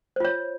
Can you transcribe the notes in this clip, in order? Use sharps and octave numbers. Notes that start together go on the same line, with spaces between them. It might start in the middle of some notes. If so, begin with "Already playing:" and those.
F4 C5 C#5